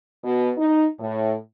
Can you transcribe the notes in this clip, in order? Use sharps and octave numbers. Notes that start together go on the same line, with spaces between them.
B2
D#4
A2